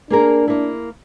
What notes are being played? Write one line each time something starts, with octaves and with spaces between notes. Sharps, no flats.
A#3 D4 G#4 A#4
A#3 E4